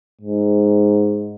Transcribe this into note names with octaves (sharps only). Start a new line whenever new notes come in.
G#2